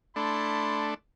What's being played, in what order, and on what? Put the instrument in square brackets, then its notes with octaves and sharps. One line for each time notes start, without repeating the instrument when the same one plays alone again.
[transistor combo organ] A3 D4 [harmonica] E4 C6